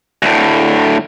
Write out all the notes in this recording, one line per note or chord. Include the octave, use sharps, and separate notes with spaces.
D2 A2